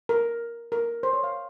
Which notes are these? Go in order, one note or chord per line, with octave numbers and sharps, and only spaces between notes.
A#4
A#4
C5
C#5
F5